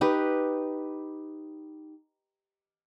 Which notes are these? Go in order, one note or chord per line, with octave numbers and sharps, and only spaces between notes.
D#4 G4 B4